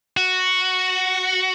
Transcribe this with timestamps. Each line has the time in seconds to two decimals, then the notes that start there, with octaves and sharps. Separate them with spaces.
0.17 F#4